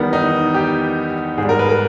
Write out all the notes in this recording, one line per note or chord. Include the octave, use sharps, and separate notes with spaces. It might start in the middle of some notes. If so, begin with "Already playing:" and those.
Already playing: E2 D#3 G3 B3
D#4
G4
G#2 G#4
G3
A#4
B4
A#4